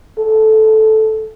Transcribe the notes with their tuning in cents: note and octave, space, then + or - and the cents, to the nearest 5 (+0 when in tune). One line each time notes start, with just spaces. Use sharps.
A4 -10